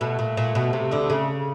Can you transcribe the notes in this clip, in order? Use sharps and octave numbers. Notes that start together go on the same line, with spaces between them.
B2 A3
A#2
A#2
B2
C3
D2 D3
C#3 A3